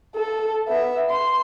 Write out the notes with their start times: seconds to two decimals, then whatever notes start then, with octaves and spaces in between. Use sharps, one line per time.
0.15 A4
0.69 B3 E5
1.10 C6